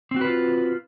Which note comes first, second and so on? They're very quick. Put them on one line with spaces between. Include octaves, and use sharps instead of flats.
C4 F#4 B4 F4